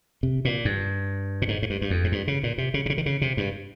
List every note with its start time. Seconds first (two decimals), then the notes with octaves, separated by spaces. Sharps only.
0.23 C3
0.45 A#2
0.65 G2
1.42 A#2
1.48 G#2
1.62 G#2
1.70 G2
1.82 G2
1.91 F2
2.04 G#2
2.12 G2
2.28 C#3
2.43 A#2
2.58 C3
2.74 C#3
2.86 C3
2.90 C#3
2.98 D#3
3.06 C#3
3.22 C3
3.37 G2